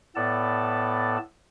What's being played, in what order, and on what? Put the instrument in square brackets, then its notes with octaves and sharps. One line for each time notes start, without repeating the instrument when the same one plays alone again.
[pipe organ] A2 B3 A4 D5 A5